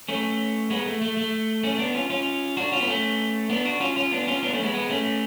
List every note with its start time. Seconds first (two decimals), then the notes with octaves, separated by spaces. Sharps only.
0.08 A3 C#4
0.70 G#3 B3
0.86 A3
1.01 A3
1.17 A3
1.63 A3 C#4
1.79 B3 D4
1.95 C#4 F4
2.10 C#4 F4
2.57 D4 F#4
2.72 C#4 F4
2.80 B3
2.88 A3 C#4
3.50 B3 D4
3.65 D4 F#4
3.80 C#4 F4
3.96 C#4 F4
4.12 B3 D4
4.27 C#4 F4
4.43 B3 D4
4.53 A3 C#4
4.63 G#3 B3
4.74 G#3 B3
4.90 A3 C#4